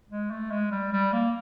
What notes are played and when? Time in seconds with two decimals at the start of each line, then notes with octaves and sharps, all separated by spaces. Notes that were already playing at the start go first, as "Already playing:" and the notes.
0.10 G#3
0.31 A3
0.51 G#3
0.71 G3
0.92 G3
1.13 A#3